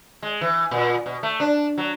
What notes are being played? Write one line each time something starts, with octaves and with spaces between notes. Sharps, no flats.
G#3
E3
A#2
B2
A3
D4
F#3